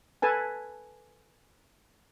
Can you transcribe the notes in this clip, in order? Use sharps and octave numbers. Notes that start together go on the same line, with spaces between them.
A4 B4 G#5 A5